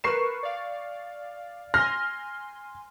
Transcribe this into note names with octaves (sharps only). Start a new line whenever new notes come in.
A#4 B4 C#6 C7 E7
D5 F5
G#5 C6 F6 A#6